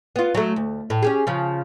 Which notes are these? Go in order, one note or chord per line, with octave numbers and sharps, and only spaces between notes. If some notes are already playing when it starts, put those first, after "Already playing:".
B3 F4
F#3 A3
D2
A2
C#4 G4 G#4
C#3 F3